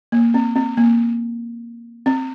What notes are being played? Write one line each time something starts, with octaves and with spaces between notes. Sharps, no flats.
A#3
C4
C4
A#3
C4